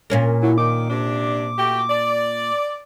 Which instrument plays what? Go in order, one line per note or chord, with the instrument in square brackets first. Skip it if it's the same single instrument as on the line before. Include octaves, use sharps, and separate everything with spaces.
[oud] A#2 C#4 A#4
[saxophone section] A2 F#3 [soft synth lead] E4
[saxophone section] D#3 [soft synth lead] D6
[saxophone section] C3 D4
A3 F#4 G4
D5